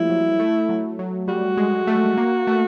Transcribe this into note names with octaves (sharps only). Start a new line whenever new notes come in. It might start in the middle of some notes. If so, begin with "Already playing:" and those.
Already playing: F3 G3 A3 A#3 E4
F#3
A3
F#3
F#3
G3 F#4
G#3
A3
A#3
A3